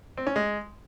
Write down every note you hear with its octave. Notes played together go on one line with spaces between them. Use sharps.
C4
C#4
G#3